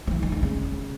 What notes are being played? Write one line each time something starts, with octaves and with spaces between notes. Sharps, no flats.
F3
E3
D#3
D3
C#3